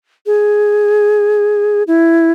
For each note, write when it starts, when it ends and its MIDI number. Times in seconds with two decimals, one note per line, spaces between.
0.26 1.83 68
1.87 2.32 64